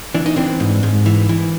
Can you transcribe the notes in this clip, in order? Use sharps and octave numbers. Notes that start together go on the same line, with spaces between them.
E3 D4
D#4
E3 C4 D4
G#2
G#2
E3
E3